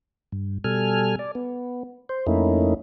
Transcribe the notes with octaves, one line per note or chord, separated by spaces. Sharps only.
G2
B2 G3 A4 G#5 F6
D5
B3
C5
F2 A3 A#3 C#4 D#4 E4